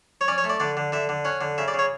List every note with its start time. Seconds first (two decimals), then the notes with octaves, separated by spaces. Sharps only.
0.21 C#5
0.28 C#4 D5
0.38 C#5
0.44 A3
0.49 D5
0.60 D3 D5
0.77 D3
0.92 D3 E5
1.09 D3
1.25 C#4 F#5
1.41 D3
1.58 C#3 E5
1.68 D5
1.74 C#3 C#5